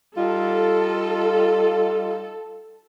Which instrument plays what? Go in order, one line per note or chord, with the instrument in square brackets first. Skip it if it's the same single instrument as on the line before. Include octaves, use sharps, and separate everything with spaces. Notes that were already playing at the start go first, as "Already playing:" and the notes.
[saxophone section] G3 D#4 F4 [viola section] A4